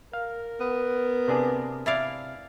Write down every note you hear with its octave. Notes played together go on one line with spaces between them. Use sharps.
A#4 F5
B3
C3 D4 G#4
E4 D5 F5